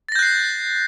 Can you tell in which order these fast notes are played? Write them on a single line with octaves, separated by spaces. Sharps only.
A6 A#6 G6 F#6 C7